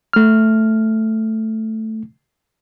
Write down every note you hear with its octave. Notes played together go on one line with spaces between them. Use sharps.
A3 F6